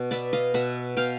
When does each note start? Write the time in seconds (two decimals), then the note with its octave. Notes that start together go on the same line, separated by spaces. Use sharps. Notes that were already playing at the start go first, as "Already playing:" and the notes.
Already playing: B2
0.11 B3 D5 E5
0.33 D#5 F5
0.54 B2 E5 F#5
0.97 B2 F5 G5